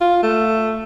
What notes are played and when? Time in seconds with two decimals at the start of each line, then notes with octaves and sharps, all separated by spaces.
0.01 F4
0.23 A3